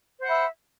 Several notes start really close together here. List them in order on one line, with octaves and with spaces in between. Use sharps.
C5 F#5 E5 B5